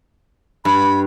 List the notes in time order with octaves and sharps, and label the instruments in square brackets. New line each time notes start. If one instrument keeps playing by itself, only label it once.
[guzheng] G2 [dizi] B5